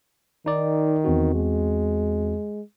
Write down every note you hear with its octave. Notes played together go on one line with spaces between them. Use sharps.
D#3 D#4 D5
E2 C4 F#4
G#3